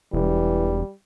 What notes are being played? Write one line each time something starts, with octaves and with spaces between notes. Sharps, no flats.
E1 E3 G3